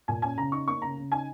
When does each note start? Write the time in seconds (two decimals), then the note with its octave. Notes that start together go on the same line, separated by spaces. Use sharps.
0.08 A#2 G#5
0.22 C#4 G#5
0.38 C#3 A#5
0.52 D#4 C#6
0.68 A#3 C#6
0.82 C#3 A#5
0.97 C#3
1.12 D#4 G#5